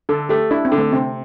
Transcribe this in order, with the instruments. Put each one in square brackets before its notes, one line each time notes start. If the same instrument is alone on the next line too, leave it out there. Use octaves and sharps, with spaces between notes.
[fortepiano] D3 [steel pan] A4
[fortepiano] A3 [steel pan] G4
[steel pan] D4 [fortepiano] E4
[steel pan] C4
[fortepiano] D3
[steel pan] A3
[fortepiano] C3 [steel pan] C4